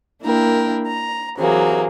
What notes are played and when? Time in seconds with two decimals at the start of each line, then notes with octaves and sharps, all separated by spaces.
0.22 A#3 D4 E4 A#4 G5
0.86 A#5
1.38 C3 E3 F#3 A#3 G#4